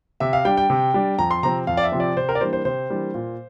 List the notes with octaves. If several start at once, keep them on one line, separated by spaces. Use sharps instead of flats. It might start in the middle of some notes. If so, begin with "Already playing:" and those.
C3 E5
F5
G3 D4 G5
G5
C3
G3 D4
F2 A#5
C6
C3 F3 C4 A#5
F2 F5
D5
E5
C3 F3 C4
D5
C3 C5
A#4
D5
E3 G3 A#3 D4 C5
C5
C3 C5
E3 G3 A#3 D4
A#2